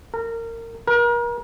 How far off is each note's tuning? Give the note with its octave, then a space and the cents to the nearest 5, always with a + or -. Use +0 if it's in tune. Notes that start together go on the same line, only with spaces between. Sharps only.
A#4 -25
A#4 +35